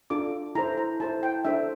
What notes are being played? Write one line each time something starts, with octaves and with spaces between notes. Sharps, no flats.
D4 F4 A4 D6
E4 A4 C5 A#5
A#5
E4 A4 C5 A5
G5
D4 A4 C5 E5